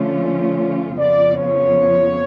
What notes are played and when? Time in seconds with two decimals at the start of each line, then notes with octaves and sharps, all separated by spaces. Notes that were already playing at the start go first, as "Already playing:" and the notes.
Already playing: D3 F3 A3 C#4 F4 C#5
0.97 F2 C#3 F3 B3 F4 D5
1.36 C#5